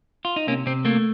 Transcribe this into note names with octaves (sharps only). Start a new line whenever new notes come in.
F4
D#4
C3 A#3 C#4
C3 C4
A3 A#3